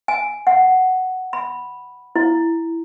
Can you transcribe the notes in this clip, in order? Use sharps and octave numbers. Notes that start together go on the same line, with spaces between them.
G#5
F#5
B5
E4